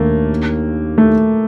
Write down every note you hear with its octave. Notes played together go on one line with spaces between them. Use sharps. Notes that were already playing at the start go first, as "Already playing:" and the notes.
Already playing: D#2 A3 A#3 D4
A3